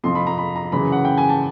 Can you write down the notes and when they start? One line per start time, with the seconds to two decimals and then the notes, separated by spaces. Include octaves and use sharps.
0.04 F2 C3 F3 C6
0.15 B5
0.27 A#5
0.38 B5
0.56 A#5
0.72 F#2 C#3 E3 B5
0.92 F#5
1.05 G5
1.18 G#5
1.29 A5